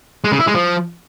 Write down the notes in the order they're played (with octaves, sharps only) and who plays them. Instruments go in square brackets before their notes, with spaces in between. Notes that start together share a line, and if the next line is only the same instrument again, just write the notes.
[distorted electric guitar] G#3
C#3
E4
G#3
F3